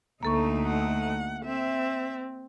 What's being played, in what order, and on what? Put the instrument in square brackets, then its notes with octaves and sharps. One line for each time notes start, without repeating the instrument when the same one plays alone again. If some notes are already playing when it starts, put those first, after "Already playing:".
[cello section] D2 A3 D#4 [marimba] A#3 A4 C#6
[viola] F#5
[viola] C4 [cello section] E5